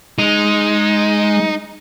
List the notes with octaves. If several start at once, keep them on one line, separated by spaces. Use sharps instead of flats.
G#3 D#4